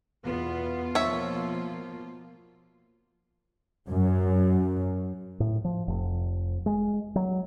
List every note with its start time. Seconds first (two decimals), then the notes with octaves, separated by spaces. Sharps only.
0.24 E2 B2 B3 F4
0.95 F3 A#3 C#5 E5
3.90 F#2
5.40 A2
5.64 F3
5.88 F1
6.66 G#3
7.16 F#3